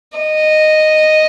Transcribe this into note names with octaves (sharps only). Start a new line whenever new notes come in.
D#5